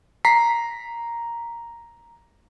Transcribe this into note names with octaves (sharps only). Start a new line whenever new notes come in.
A#5 B6 C7